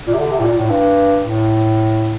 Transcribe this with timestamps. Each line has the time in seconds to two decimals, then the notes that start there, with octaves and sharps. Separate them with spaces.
0.07 A#2
0.14 C3
0.20 D3
0.32 C3
0.40 A2
0.45 A#2
0.58 A2
0.70 G2
1.20 A2